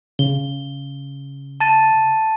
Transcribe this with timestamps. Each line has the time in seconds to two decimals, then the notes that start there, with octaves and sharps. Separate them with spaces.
0.19 C#3 G7
1.60 A5 A6 D#7